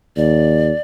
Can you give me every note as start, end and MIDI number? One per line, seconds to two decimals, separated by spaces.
0.17 0.71 39
0.17 0.82 74